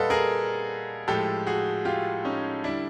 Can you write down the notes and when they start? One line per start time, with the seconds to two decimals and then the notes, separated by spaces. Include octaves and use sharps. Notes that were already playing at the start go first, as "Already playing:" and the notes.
Already playing: A#2 G3 A4 B4 D#5 F5 F#5
0.10 G#4 A#4
1.07 A2 F3 G#3 G4 A4
1.47 F#4 G#4
1.85 F4 G4
2.25 C#4 D#4
2.64 D3 G3 D4 E4